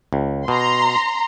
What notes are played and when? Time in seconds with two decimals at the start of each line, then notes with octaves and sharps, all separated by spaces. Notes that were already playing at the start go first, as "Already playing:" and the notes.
0.13 C#2
0.48 B2 A#5 C6